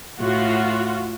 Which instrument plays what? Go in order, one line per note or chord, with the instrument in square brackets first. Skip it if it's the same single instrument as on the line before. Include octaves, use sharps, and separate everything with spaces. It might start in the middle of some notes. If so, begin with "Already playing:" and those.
[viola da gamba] A2 [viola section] F4 F#4